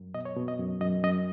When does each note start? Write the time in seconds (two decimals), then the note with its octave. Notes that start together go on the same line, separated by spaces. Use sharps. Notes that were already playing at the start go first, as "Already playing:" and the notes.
Already playing: F#2
0.14 B2 D#5
0.25 C#5
0.37 B2
0.48 D#5
0.59 F#2
0.81 F#2 D#5
1.04 F#2 D#5